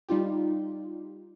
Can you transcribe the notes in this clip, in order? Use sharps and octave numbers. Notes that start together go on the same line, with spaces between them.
G3 D#4 F4 G4